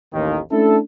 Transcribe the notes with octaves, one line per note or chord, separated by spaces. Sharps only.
A1 D#2 D#3
A3 C#4 D4 E4 A4